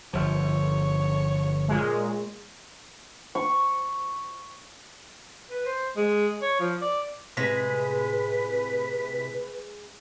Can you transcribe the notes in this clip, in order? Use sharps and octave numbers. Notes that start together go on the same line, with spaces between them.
G1 F3 C#5
A#2 G#3
C#6
B4
C5
G#3
C#5
F3
D5
A2 C3 G#3 B4 B6